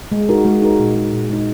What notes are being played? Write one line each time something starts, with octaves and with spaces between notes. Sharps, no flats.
G#3
D#4 F#4 A#4
G#3
D#4 F#4 A#4
A#2
G#3 D#4
A#2
G#3 D#4